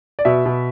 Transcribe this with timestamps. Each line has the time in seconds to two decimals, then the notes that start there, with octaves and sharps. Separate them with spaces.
0.19 D5
0.25 B2 E5
0.45 B2